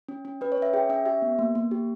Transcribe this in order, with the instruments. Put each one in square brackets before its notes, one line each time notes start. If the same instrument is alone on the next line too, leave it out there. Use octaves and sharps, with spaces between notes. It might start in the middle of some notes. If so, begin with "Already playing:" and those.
[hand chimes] C#4
C#4
C#4 B4
C#5
C#4 E5
G#4 G5
C#4 E5
G4 E5
B3
A#3
A#3
G4